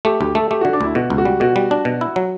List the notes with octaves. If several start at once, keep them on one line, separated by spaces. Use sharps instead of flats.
A3 G4
D2 G4
A3 A4
A3 G4
D3 F#4
D4
D2 E4
B2 F#4
C#2
F#4
G3
B2 F#4
G3
D4
B2
E4
F#3